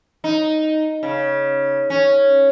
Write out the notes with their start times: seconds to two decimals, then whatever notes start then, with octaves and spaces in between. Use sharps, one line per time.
0.24 D#4
1.03 C#3
1.90 C#4